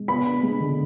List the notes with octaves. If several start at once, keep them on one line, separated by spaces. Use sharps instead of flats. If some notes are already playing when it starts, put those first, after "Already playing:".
Already playing: G#3
B3 B5
D4
G#3
D3